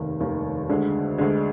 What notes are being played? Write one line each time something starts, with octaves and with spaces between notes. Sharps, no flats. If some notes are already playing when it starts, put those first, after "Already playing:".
Already playing: F1 D#2 D#3
F1 D#2 D#3
D2 D3 G#3
D2 D3 G#3